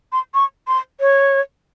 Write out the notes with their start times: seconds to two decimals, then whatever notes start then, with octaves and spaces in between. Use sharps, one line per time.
0.12 C6
0.34 C#6
0.68 C6
1.00 C#5